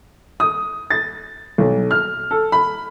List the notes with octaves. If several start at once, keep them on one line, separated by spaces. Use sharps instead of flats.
D#6
A6
B1
F6
A4
B5